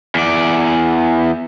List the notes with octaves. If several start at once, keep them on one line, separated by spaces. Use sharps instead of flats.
E2 D5